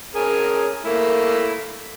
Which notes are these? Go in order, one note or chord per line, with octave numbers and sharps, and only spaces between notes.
C#4 G#4 A#4
A3 A#3 E4